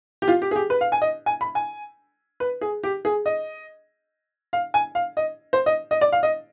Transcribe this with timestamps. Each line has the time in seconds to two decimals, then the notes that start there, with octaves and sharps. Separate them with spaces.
0.22 G4
0.28 F4
0.42 G4
0.51 G#4
0.56 G4
0.70 B4
0.81 F5
0.92 G#5
1.02 D#5
1.26 G#5
1.41 B5
1.55 G#5
2.40 B4
2.61 G#4
2.84 G4
3.05 G#4
3.26 D#5
4.53 F5
4.74 G#5
4.95 F5
5.17 D#5
5.53 C5
5.66 D#5
5.91 D#5
6.01 D5
6.12 F5
6.23 D#5